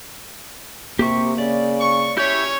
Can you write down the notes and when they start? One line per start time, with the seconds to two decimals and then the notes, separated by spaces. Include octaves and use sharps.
0.99 C3 A#3 G4 C#6
1.38 C#3 D5
1.80 C#6
2.17 C#4 E4 G4 C#5 G6